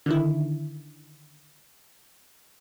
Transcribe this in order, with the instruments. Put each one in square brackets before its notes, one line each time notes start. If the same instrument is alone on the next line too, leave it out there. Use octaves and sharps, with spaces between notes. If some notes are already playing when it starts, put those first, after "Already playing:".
[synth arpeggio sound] D3 D#3 E4